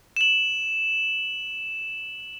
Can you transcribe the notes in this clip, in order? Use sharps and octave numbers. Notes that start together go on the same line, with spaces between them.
E7 F#7